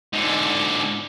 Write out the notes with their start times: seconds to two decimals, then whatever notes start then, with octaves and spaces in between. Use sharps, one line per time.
0.13 G#2 D3